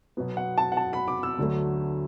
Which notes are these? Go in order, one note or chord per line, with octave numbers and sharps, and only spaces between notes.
B2 F#3 B3
F#5
A5
F#5
A5
B5
D6
E6
D2 D3 F#3 A3